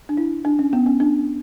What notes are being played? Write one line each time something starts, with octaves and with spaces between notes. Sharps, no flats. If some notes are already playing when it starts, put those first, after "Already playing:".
D4
E4
D4
C#4
B3
C#4
D4